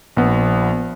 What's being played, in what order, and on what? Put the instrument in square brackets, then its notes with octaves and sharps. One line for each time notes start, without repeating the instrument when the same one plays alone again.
[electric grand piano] A#1 B3